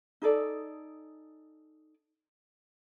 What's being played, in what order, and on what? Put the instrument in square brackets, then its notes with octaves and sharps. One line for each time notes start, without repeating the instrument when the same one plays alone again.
[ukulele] D#4 G#4 A4 D5